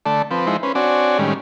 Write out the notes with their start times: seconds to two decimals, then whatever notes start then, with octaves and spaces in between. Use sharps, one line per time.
0.06 D3 A3 D5 A5
0.31 F3 C4 B4
0.47 F3 G#3 D#4 E4 C5
0.63 C#4 B4 C5
0.75 C4 D4 F#4 C#5 D5 G#5
1.19 A2 D#3 G3 G#3 C#4